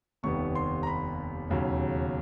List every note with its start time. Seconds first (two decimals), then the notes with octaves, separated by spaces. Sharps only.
0.23 F1 D#2 D#3 G3 B3 C#6
0.55 C6
0.83 A#5
0.87 B5
1.49 E1 D#2 C#3 F#3